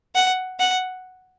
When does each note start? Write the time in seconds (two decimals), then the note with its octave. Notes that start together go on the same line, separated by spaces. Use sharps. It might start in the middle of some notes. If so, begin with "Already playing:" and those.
0.15 F#5
0.59 F#5